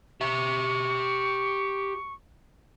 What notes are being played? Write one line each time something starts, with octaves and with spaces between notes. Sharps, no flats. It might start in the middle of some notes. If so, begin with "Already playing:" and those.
G4 E5 C#6